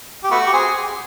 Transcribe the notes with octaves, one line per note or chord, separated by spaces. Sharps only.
G4
A3 B3 F#4
G4
C4 G#4